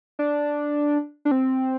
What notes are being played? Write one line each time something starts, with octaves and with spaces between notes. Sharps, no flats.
D4
D4
C4